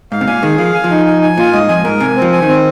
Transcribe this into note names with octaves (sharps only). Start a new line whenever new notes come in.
G#2 F5
C3
A#2 G#5
D#3 G#4
F3 F5
G#5
F3
D#4
G#5
G#5
A#2 F4
G#2 D#5
F2 G#5
G#2 A#4
C3 G#5
C4
F3
G#5
D#3
C4